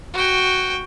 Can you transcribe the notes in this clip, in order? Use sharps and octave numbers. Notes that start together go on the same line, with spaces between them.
F#4 G5